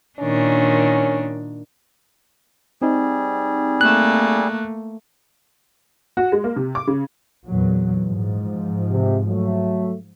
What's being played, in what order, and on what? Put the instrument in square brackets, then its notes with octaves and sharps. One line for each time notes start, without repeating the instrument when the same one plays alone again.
[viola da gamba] A#2 D#3 D4 [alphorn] C#4
[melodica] G3 G#4 [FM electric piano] C4 D#4
[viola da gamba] A3 A#3 [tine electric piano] F#6
[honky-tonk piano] F#4
G#3
A#3
C3
D6
C#3
[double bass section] E2 A#2 F#3
G#2 F3
[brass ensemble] C3
F#3 A3